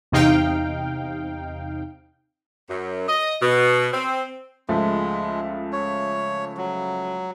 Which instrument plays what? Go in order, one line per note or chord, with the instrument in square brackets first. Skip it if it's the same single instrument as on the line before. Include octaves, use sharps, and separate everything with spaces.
[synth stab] E2 C3 D#4 F5 G5
[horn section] F#2
D#5
B2
C4
[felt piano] C#2 F3 A3 [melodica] G#3
[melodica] C#5
F#3